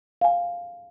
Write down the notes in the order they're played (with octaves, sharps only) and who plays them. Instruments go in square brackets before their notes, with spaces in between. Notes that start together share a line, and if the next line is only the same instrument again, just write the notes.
[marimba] F5 G#5